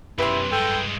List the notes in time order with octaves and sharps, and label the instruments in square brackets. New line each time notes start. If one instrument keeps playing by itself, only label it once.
[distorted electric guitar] B1 F#2 [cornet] E4 [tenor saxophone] G4 [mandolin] B4 C6
[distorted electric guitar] G2 G#3 [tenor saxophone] A4 [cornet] G5